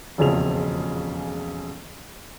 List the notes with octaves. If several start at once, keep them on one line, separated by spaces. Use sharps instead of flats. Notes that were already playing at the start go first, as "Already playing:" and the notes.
E1 A#1 F2 C#3 F7